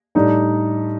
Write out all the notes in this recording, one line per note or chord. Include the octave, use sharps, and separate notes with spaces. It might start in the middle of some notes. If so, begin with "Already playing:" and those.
A2 G3 D4 D#4